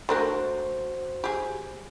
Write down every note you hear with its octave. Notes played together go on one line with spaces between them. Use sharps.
A3 D4 F#4 A#4 C5
G4 G#4